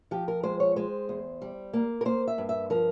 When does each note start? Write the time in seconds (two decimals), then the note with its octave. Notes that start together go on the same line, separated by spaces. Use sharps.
0.11 F3 G4
0.28 A#4
0.43 G#3 C5
0.60 C#5
0.76 G#3 C5
1.09 E2
1.42 G3
1.73 A#3
2.01 A#4
2.05 A#3 C5
2.28 E5
2.38 G2
2.49 E5
2.70 F3 A#4